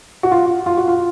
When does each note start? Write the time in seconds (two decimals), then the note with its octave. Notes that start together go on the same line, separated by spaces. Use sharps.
0.23 F#4
0.31 F4
0.66 F4
0.77 F#4
0.88 F4